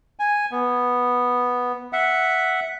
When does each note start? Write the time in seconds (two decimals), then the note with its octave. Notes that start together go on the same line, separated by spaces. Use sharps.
0.19 G#5
0.52 B3
1.93 E5 F#5